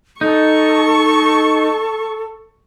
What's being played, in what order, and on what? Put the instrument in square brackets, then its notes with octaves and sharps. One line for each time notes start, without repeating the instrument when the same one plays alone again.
[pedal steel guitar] D#4 [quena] A4 [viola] C#6